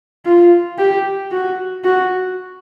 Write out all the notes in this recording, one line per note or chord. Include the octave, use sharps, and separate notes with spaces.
F4
G4
F#4
F#4